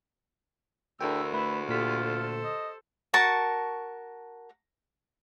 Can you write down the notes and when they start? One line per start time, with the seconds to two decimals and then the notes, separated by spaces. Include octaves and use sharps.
1.01 D2 D4 E4 G#4 A#4 G5 E6
1.33 A3 E4 B4 B5
1.69 A#2 F4 G4 A4 B6
2.01 A4 C5
2.44 D#5
3.14 F#4 A#4 A5 C#6